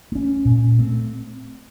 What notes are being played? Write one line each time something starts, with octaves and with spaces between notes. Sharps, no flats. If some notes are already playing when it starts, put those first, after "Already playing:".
A3 C#4
A#2
A3 C4